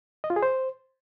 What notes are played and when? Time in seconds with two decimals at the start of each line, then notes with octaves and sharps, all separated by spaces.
0.24 D#5
0.30 F4
0.36 G#4
0.43 C5